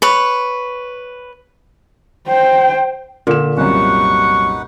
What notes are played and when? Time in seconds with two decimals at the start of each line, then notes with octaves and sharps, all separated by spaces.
0.02 B4 C#5
2.27 C5 G5
3.27 A#2 D3 E7
3.58 C2 F#2 D#4 B4 F#5 C#6